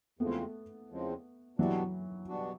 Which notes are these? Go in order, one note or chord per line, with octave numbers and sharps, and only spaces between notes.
E2 C#3 F3 G#3 A3 B3 C4
E2 C#3 F3 G#3 C4
B2 E3 F#3 G3 B3 D4 F#4
B2 G3 B3 D4 F#4